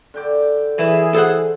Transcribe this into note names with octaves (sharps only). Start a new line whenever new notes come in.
D3 G5 D6
E3 E4 G#4 B4
A4 C5 F#5